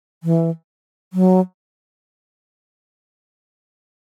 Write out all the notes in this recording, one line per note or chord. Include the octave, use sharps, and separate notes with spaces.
E3
F#3